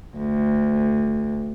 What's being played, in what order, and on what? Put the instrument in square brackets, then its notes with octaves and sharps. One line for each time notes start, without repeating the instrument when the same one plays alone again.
[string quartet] D2